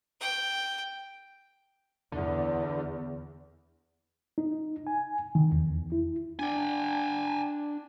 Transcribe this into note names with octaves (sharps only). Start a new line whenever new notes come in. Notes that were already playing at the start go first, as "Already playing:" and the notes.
G5
E2 D3
D#4
G#5
D#3
E2
E4
D4 G5 G#5